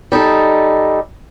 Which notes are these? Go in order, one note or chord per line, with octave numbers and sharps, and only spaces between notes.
G3 D#4 A4